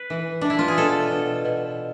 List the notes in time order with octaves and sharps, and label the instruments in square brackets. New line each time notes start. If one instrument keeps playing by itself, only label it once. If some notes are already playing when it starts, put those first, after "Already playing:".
Already playing: [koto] B4
E3
E3 D4
E4
F4
G#4
B2 A4
B2
B2